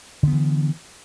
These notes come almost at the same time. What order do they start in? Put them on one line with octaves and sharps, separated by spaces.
D3 B3 E3